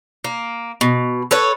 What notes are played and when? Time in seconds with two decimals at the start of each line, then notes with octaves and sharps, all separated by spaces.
0.24 A#3
0.81 B2
1.31 A4 B4 C#5